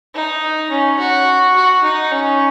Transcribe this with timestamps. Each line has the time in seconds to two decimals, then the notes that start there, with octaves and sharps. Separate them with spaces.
0.15 D#4
0.71 C#4
0.99 F#4
1.55 F#4
1.84 D#4
2.11 C#4